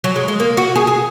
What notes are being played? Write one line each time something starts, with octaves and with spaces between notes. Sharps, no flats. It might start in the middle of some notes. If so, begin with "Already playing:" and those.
F#3
G#3
G#3
A#3
F#4
G#4
G#4